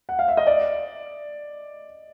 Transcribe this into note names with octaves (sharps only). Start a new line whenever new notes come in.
F#5
F5
E5
D#5
D5